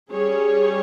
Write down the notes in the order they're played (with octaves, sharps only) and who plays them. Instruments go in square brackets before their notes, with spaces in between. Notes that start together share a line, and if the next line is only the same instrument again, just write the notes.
[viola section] G3 C#4 G#4 C#5